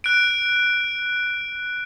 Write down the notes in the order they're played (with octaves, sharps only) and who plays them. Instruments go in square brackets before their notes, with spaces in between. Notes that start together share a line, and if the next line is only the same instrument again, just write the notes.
[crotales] F#6 D7